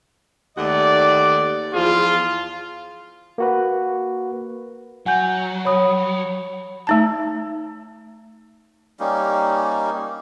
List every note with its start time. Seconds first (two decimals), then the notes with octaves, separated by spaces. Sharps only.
0.58 D#2 A3 D5 F#5
1.73 E2 F3 F4 G#4
3.38 A#3 F#4 B4
5.06 F#3 F#5 G#5 G6
5.65 C#5 B5 D#6
6.87 A3 D#4 A5
9.00 G3 A#3 C#4 D#4